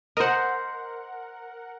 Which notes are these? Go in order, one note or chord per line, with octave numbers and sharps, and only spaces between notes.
A#4 C5 D#5 F#5